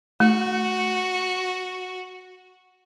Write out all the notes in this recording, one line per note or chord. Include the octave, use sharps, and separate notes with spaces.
A3 F#4